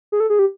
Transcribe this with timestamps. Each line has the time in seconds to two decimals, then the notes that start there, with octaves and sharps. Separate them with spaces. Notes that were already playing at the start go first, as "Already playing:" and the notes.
0.12 G#4
0.20 A4
0.30 G#4
0.39 G4